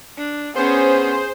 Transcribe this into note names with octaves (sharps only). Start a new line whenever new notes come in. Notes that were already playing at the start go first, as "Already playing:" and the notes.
D4
B3 C#4 G#4 C5